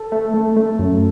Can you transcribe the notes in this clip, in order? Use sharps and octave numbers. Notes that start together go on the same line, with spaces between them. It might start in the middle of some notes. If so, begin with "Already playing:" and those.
Already playing: A4
A3
A3
A3
F#2